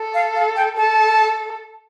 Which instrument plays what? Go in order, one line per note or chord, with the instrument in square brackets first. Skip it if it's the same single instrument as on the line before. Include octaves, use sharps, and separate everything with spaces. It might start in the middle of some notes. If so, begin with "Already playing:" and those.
Already playing: [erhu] A4
[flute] F5
F5
G5
[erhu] A4 [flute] A5